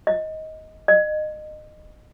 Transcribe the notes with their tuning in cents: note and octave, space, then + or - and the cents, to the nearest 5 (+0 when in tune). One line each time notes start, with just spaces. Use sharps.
D#5 +15
D#5 -25